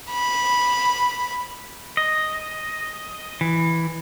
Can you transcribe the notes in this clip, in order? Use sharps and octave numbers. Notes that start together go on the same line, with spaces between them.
B5
D#5
E3